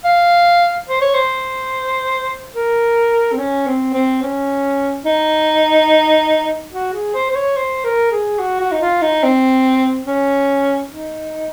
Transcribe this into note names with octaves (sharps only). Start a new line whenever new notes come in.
F5
C5
C#5
C5
A#4
C4
C#4
C4
C4
C#4
D#4
F#4
G#4
C5
C5
C#5
C5
A#4
G#4
F#4
F#4
D#4
F4
D#4
C4
C#4
D#4